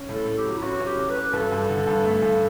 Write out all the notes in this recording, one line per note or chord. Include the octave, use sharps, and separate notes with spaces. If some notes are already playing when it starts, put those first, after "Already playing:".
Already playing: C#4
A2
A4
A2
G4
F#3
E4
C#4 F#4
C#4
G4
F#3
B4
C#4
G2 A4
G2
D3
G2
A3
G2